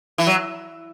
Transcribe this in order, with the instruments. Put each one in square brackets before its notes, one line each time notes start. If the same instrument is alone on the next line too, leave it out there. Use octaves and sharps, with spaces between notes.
[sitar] E3
F#3